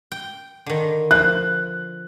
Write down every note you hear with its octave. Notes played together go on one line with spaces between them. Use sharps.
G5
D3 D#3
F3 F#6